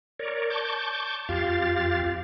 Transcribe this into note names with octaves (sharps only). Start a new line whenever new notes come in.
A#4 C#5 D5
A5 C#6 D6 G6
F2 F4 G4 F5 A6